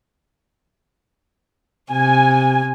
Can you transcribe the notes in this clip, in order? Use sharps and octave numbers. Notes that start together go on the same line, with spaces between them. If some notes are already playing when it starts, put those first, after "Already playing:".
C3 G#5